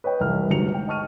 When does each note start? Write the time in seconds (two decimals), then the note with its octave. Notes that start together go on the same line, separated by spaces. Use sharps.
0.04 B4 C#5 D#5 G5
0.20 F1 C2 E3 F6
0.50 G1 D2 G#2 F#4 C#7 F7
0.74 G5
0.88 D#5 A5 C#6 F6 D#7